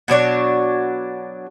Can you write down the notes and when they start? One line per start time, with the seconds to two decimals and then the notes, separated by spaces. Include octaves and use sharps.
0.08 B2 F#3 D4 C#5